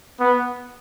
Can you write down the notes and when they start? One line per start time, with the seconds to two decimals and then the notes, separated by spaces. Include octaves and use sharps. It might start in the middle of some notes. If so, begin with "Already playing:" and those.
0.20 B3